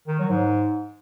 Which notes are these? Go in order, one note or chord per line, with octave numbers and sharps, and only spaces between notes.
D#3
F#3
G#2